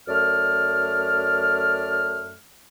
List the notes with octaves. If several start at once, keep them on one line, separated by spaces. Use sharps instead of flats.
F#2 A3 D5 F6